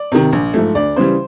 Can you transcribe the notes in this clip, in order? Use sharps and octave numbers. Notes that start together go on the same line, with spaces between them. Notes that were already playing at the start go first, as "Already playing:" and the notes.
Already playing: D5
C3 D#3
A#1
G#2 F3 A3
D2 D5
C#3 E3 G3 C5